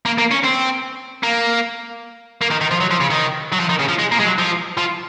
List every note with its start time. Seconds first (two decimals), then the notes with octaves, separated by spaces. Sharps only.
0.06 A#3
0.18 A#3
0.31 C#4
0.44 C4
1.23 A#3
2.42 A#3
2.51 D#3
2.61 D#3
2.71 F3
2.81 F#3
2.91 F3
3.01 C#3
3.11 D#3
3.53 F#3
3.60 F3
3.69 D#3
3.79 C#3
3.89 F3
3.99 G#3
4.12 A#3
4.20 G#3
4.25 F#3
4.38 F3
4.78 F3